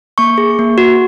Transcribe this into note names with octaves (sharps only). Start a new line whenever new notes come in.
A#3 C#6
G#4
A#3
F#4